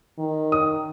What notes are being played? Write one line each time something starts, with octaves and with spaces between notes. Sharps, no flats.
D#3
D#6